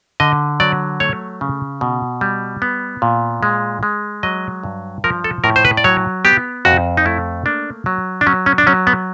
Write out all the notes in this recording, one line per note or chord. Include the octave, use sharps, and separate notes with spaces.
D3 D#5
F#3 D5
A3 C#5
C#3
B2
G3
B3
A#2
G#3
G#3
F#3 D#5
G2
F3 A#4
A4
A2 A#4
C5
B4
D5
F#3 C#5
B3 G4
F2 F#4
D#4
A3 E4
A#3 D4
F#3
D4
F#3 C#4
C#4
D4
F#3 C#4
B3